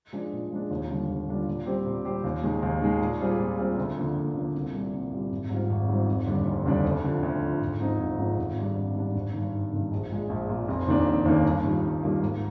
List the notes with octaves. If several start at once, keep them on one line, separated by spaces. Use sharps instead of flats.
F3 G#3 D4
A#2
F3 G#3 D4
D#2
D3 G3 D4 F4
D#2
D3 G3 D4 F4
A#2
G3 C4 G4 C5
A#2
G3 C4 G4 C5
D#2
D#3 G#3
D#2
D#3 G#3
A#2
G3 C4 F4 G#4
A#2
G3 C4 F4 G#4
D2
D3 F3 A#3
D2
D3 F3 A#3
C2
A#2 G3
C2
A#2 G3
G#1
G#2 G3 C4 F4
G#1
G#2 G3 C4 F4
F1
D#2 D3 G3 D4
F1
D#2 D3 G3 D4
D2
D3 F3
D2
D3 F3
G#1
G#2 F3 C4 D#4
G#1
G#2 F3 C4 D#4
G#1
G#2 G3 D4
G#1
G#2 G3 D4
G#1
G2 D#3
G#1
G2 D#3
A#1
A#2 G#3
A#1
A#2 G#3
F1
D#2 D#3 A#3 D4
F1
D#2 D#3 A#3 D4
G2
D#3 G3 A#3 F4
G2
D#3 G3 A#3 F4
G#2